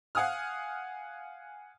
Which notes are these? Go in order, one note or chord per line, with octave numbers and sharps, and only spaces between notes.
F5 F#5 G#5 D#6 F6